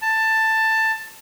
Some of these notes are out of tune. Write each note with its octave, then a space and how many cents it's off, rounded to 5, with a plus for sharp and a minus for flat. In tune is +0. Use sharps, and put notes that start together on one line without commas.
A5 +10